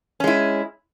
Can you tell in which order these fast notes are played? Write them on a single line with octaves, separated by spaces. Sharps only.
C#4 G#3 E4